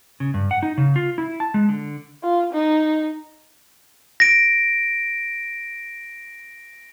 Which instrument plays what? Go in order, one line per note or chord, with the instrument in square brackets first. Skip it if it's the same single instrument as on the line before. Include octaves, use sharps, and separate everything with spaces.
[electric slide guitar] C#3
G2
F#5
D#4
C#3
F4
E4
A5
G#3
D3
[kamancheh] F4
D#4
[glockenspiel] A#6 D7